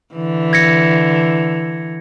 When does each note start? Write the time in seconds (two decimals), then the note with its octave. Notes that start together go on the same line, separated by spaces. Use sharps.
0.14 D3 E3
0.53 G#6 A#6 C#7